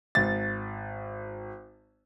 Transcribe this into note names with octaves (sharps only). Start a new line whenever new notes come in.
G#1 A6